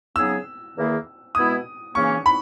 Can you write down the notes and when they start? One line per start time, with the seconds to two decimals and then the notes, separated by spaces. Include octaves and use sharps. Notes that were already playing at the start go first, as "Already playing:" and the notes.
0.16 C#3 F#3 B3 D#4 G#4 E6
0.75 E2 D#3 A#3 E4 G#4
1.35 B2 G#3 B3 E4 D#6
1.95 C#3 E3 A#3 C#4 C#6
2.26 B5